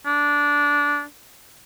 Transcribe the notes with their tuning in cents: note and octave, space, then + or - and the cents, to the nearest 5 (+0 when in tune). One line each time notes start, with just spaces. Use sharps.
D4 -15